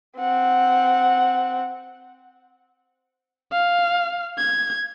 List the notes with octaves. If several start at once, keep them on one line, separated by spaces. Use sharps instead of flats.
C4 F#5
F5
G#6